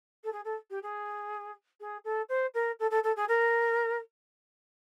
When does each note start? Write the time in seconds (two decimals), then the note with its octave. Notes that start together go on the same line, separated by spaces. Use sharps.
0.24 A4
0.32 G#4
0.45 A4
0.70 G4
0.83 G#4
1.80 G#4
2.04 A4
2.29 C5
2.54 A#4
2.80 A4
2.91 A4
3.04 A4
3.16 G#4
3.29 A#4